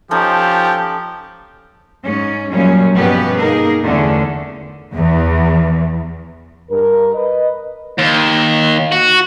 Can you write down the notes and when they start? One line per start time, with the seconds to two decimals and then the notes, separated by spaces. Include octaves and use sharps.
0.11 F3 C#4 D#4 G4 A4
2.03 G#2 C#4
2.52 F#2 A#2 F3 G3 C#4
2.94 G2 B2 B3 C#4 G4 B4
3.37 A#3 D#4 G#4 A#4
3.83 E2 D3 A3 C#4
4.94 E2
6.70 G2 A#4
7.14 B4 D#5
7.99 D#2
8.92 F#4